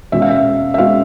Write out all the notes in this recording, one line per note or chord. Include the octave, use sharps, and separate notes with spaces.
E2 B2 G#3 C#4 E5
F5
E5
E5
B2 G#3 C#4 F5